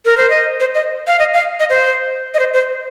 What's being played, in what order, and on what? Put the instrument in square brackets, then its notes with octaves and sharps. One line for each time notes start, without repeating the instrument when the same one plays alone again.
[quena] A#4
C5
D#5
C5
D#5
F5
D#5
F5
D#5
C5
D#5
C5
C5